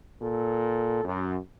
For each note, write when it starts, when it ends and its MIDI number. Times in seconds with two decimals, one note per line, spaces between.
0.22 1.01 46
0.22 1.01 69
1.04 1.37 42